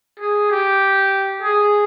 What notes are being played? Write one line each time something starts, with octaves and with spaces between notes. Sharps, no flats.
G#4
G4
G#4